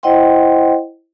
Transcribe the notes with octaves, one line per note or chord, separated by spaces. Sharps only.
E4 C5 D#5 F#5 G5 C6